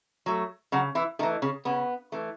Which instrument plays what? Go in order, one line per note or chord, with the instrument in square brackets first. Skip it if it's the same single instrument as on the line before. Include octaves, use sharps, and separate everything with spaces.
[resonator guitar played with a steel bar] F#3 A3
C#3 F#3 F#4
E3 E4
D#3 A3 D#4
E3
C#3 C#4
C#3 B3
E3 A3